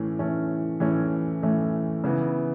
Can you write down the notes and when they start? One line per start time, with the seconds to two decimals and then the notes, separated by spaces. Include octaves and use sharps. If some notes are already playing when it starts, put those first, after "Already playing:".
Already playing: A2 E3 A3 C#4
0.19 A2 E3 A3 C#4
0.80 A2 E3 A3 C#4
1.42 A2 E3 A3 C#4
2.04 C#3 E3 B3